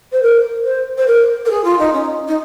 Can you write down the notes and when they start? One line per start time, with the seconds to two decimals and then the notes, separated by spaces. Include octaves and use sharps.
0.12 C5
0.22 A#4
0.64 C5
0.98 C5
1.07 A#4
1.45 A#4
1.50 G#4
1.64 F4
1.79 D#4
1.93 C#4
2.28 D#4